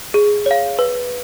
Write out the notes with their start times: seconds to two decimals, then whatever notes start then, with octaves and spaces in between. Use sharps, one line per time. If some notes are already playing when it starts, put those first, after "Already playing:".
0.14 G#4
0.46 C#5 F5
0.79 B4